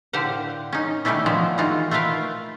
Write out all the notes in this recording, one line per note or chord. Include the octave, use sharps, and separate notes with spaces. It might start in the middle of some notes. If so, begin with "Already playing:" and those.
A2 D3 G4 C5 F5 F#5
C#4 D#4
D#3 G3 A3 C#4 D4 E4
A#2 F3 G#3 B3
D#3 E3 D#4 F4 F#4
A3 F4 A#4 B4 F5